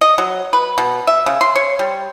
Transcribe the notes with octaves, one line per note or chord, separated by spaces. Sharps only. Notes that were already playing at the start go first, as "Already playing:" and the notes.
D#5
F#3
B4
B2
E5
C#3
C6
C#5
G3